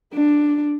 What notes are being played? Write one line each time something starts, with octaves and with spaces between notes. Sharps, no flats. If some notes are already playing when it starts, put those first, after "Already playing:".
D4